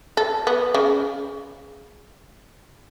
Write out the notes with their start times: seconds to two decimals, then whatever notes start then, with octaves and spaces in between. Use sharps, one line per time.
0.17 A4
0.47 B3
0.74 C#3